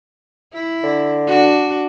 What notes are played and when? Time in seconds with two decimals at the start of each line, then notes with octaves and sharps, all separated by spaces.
0.53 E4
0.83 D3
1.27 D4 F#4